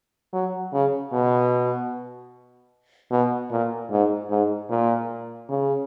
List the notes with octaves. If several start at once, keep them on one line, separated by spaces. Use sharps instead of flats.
F#3
C#3
B2
B2
A#2
G#2
G#2
A#2
C#3